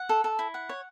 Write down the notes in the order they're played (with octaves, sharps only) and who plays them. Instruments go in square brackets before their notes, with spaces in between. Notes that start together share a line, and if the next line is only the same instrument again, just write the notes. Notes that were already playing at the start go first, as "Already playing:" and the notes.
Already playing: [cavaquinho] F#5
A4
A4
E4
F#5
C#5